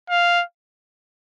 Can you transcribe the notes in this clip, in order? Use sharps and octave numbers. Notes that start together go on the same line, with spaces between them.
F5